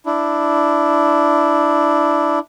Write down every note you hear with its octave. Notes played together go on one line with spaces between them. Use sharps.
D4 E4